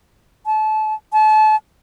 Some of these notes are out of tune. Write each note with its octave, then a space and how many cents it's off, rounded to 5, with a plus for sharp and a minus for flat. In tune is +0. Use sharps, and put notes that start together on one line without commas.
A5 -30
A5 -35